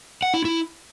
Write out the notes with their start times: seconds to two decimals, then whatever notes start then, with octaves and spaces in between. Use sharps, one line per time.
0.22 F#5
0.34 E4
0.45 E4